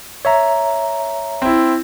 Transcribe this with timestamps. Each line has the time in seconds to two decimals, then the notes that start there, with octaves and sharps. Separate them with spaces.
0.25 C#5 E5 A#5
1.42 C4 E4